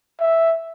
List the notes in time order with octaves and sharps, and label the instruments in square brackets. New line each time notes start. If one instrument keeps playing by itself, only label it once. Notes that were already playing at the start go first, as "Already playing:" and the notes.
[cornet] E5